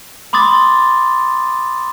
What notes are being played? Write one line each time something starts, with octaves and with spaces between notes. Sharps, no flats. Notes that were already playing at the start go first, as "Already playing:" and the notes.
B5 C6 D6 D#6 A6